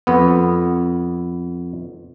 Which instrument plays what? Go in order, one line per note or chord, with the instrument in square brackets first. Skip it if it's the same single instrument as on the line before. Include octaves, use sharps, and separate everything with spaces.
[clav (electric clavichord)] F2 B3